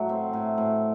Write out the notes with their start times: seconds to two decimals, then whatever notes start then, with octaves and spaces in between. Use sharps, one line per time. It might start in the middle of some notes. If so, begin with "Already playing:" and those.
Already playing: A2 F#3
0.09 C4
0.33 A2
0.58 A2